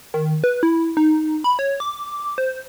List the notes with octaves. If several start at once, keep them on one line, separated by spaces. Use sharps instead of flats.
D#3
B4
E4
D#4
B5
C#5
D6
C5